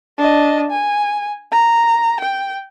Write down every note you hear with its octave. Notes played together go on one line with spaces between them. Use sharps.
D4 D#5
G#5
A#5
G5